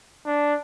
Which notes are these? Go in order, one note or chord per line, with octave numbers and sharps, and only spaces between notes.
D4